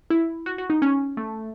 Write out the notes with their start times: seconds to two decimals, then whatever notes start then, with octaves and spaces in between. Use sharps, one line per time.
0.10 E4
0.46 F#4
0.58 F#4
0.70 D#4
0.82 C#4
1.17 A3